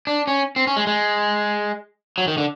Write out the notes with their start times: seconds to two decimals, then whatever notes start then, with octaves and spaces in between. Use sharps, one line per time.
0.07 D4
0.27 C#4
0.56 C4
0.67 C#4
0.76 G#3
0.87 G#3
2.18 F#3
2.28 D#3
2.38 D3